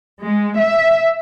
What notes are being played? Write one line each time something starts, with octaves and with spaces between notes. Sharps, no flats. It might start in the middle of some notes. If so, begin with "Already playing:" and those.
G#3
E5